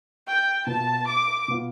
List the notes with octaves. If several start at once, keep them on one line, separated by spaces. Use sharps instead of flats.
G5
B2 B3 F4 A5
D6
B2 B3 F4